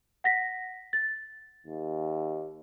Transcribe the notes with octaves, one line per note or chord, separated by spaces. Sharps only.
F#5 A#6 B6
A6
D#2